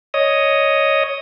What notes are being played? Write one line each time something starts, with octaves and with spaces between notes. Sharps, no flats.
C#5 D#5 D#6